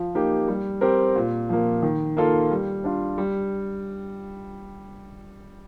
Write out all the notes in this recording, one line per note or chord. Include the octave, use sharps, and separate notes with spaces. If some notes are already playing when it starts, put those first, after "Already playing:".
Already playing: F3
A#3 D#4 G4
G3
C4 G4 A#4
A#2
F3 A#3
D#3
A#3 F4 A4
G3
D4 F4
G3